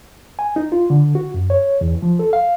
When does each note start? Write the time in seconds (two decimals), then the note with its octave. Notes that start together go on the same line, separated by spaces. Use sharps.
0.39 G#5
0.56 D#4
0.72 F4
0.90 D3
1.15 F#4
1.34 F#2
1.50 C#5
1.81 E2
2.02 F3
2.19 A4
2.33 F5